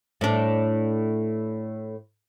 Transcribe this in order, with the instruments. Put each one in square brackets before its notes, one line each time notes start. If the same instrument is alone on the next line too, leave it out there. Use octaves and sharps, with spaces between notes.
[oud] A2 D4